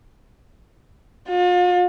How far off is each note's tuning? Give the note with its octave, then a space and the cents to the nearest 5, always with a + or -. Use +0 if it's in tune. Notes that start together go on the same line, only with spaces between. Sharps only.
F4 +40